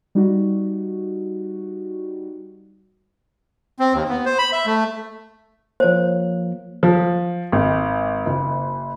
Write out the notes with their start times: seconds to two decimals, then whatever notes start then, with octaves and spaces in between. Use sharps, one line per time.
0.15 G3 D#4 F#4
3.79 C4
3.94 D#2
4.09 B3
4.25 C5
4.38 B5
4.52 E5
4.66 A3
5.80 F3 A#3 C5 C#5
6.83 F3
7.52 G#1
8.26 F#1